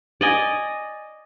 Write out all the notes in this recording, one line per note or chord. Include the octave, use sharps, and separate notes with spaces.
D5 D#5 G#5